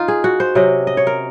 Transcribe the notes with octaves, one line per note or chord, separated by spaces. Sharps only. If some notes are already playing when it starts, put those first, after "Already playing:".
Already playing: D#4 F4
G#4
F#4
C5
C3 F#3 C#4 D#5
D#5
C#5
A#4